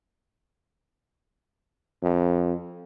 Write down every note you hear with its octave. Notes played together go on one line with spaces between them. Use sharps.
F2